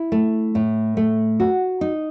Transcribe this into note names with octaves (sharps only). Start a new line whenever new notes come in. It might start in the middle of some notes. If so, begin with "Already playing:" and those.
Already playing: E4
A3
A2
A3
F#4
D#4